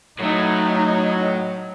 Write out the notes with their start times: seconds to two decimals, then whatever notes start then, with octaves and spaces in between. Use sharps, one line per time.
0.19 A2 F#3 A3 D#4